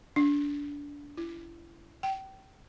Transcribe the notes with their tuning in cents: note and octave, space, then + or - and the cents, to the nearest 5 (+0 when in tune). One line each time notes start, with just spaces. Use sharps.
D4 -25
E4 +35
G5 -30